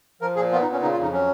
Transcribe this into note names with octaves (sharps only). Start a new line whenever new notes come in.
F3 A#4
A#2 G#4
B3 F4
D#4
A#2
C#4
C#3 D#4
F4
F2 D#4
F#3 C#4